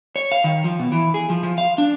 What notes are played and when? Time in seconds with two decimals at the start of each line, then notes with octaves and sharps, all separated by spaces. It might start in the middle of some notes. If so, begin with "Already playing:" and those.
0.16 C#5
0.32 F5
0.44 D#3
0.64 F3
0.80 B2
0.92 E3
1.14 G#4
1.30 F3
1.43 F3
1.58 F5
1.78 D4